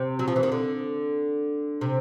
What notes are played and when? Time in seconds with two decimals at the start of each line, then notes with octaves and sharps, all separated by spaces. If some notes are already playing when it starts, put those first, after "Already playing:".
Already playing: C3
0.19 F#3
0.28 F3
0.36 E3
0.43 D#3
0.52 D3
1.81 C3